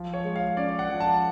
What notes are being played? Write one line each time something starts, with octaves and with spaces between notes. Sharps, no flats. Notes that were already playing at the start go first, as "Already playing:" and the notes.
Already playing: F3
C#5
G#3
F5
C#4 D5
F#5
F3
A5